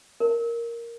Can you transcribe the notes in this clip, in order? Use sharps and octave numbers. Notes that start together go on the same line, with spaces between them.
A#4